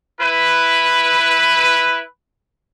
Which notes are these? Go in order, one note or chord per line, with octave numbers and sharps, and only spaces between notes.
E4 B4